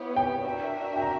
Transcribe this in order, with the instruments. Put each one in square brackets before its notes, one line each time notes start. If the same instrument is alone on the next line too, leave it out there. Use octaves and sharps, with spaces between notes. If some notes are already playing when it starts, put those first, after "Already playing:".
Already playing: [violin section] B3 E4 G4 C#5
[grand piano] G5
[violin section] D4 F#4 A#4 E5
[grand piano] G5
A#5